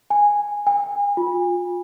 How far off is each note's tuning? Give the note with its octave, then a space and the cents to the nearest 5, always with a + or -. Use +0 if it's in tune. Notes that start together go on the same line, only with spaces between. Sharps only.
G#5 -10
G#5 -35
F4 +25